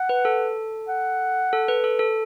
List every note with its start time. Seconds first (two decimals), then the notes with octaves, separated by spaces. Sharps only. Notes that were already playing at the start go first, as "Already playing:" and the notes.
Already playing: F#5
0.09 B4
0.25 A4
0.88 F#5
1.53 A4
1.68 B4
1.84 A4
1.99 A4